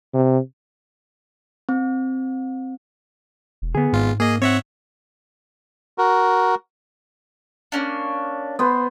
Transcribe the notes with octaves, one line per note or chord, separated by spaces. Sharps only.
C3
C4
E1
D3 B3 G#4
G#1 G#2 F4
A#3 G#4 D#5
C4 C#5 E5 F#5
F#4 A#4
A#3 C#4 D4
B3 C5